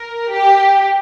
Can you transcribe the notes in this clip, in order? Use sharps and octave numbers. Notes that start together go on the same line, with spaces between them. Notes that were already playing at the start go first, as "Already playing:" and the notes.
Already playing: A#4
G4